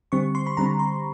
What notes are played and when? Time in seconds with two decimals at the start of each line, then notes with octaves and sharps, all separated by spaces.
0.12 D3 G3 C4 C#6
0.35 C6
0.46 B5
0.57 D3 G3 C4 A#5
0.79 C6